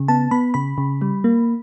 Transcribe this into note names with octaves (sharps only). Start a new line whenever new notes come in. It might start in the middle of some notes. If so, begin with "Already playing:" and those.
Already playing: C#3
B3 A5
B3 B5
C#3 B5
C#3
G3
A#3